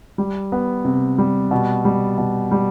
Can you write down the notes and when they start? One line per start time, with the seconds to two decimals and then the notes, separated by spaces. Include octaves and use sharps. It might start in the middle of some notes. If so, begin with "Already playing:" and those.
0.18 G3
0.52 B3
0.85 C3
1.18 G3
1.51 B2
1.85 G3
2.18 B2
2.51 G3